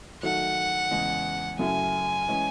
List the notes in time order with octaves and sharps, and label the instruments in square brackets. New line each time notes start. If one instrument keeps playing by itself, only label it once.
[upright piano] D#3 F#3 A3 [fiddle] F#5
[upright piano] E2 C#3 G#3
[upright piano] F#2 C#3 F#3 A3 E4 [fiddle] G#5
[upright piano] E3 G#3 C#4